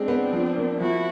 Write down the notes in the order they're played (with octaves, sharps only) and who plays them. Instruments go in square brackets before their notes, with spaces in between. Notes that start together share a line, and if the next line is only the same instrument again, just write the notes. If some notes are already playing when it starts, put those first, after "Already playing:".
Already playing: [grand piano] G#3 [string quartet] C4 D4
[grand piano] B3
F3
A#3
[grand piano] F3 [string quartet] E4 F#4